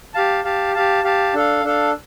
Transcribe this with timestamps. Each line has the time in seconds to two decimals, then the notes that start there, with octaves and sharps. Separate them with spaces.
0.14 G4 F5 A5
0.44 G4 F5 A5
0.74 G4 F5 A5
1.04 G4 F5 A5
1.34 D4 A4 F5
1.64 D4 A4 F5